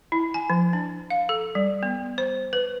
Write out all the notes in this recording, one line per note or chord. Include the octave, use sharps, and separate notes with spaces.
E4
G#5
F3
D4
F5
A4
G3
B3
C5
B4